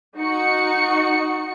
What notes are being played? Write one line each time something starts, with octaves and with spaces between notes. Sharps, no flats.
D#4 F#4 C#7